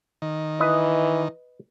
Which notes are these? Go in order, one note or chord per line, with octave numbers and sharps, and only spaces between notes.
D#3
E3 B4 D#5